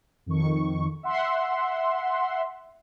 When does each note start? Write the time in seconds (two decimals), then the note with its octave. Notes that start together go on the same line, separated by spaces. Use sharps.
0.26 F2 D#3 C#6
1.03 E5 F#5 C6